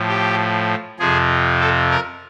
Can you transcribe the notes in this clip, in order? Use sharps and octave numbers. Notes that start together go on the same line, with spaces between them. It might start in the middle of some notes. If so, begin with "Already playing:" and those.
Already playing: A2 F3
G4
F2 C3 F3 G#4
A4
A#4